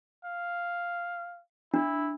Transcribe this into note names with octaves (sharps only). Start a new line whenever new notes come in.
F5
D4 E4